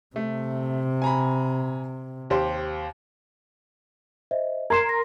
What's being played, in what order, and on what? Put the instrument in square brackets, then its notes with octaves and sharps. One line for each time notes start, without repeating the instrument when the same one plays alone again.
[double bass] C3 [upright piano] A3
[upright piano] G#5 A#5 B5
D#2 G4 C5
[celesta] C5 D#5 E5
[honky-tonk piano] A#4 C6 [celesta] G#6 C7 E7
[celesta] A#6